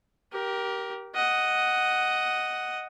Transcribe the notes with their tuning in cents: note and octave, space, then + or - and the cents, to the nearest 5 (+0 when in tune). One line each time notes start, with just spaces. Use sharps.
G4 -15 A#4 +15
D#5 +0 F#5 +5